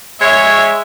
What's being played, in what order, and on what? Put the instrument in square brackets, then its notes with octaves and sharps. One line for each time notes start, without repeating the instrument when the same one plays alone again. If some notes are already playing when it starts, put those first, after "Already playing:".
[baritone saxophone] G#3 [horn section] C#5 [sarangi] E5